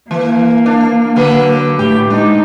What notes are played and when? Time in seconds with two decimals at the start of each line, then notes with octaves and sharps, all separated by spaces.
0.11 E3 A#3
0.66 D4
1.16 D3 F#3 B4
1.79 A2 G4
2.10 G#3 D4 D#4